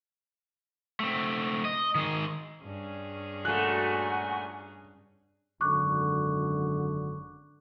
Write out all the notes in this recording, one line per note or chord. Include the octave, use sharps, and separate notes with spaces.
A3 C4
D#5
D#3 G#4
G2 C#4 G#4
A#2 A3 F#4 G#5 F#6
G#1 F#2 D3 C#6 D6 F#6